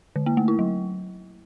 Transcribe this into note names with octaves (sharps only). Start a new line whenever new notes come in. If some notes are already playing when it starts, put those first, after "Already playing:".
D3
A#3
A3
E4
F#3